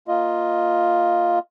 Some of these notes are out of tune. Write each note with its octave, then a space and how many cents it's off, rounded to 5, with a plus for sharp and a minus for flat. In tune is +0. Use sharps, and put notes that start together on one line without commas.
A#3 +0 F4 +0 D#5 +0